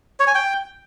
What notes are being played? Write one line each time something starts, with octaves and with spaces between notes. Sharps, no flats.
C#5
G#5
G5